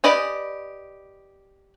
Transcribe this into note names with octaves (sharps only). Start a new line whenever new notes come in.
G4 B4 D5 D#5 G#5